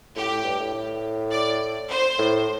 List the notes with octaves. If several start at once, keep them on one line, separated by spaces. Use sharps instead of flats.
A2 G4
A2
G2
A2
A2
D5
C5
A2